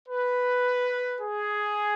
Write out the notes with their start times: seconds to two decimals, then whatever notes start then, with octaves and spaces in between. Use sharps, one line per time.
0.09 B4
1.20 G#4